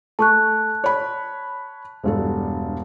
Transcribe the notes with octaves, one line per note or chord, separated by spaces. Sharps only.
A3 A5 C#6 F#6
C#5 B5
E1 G2 A4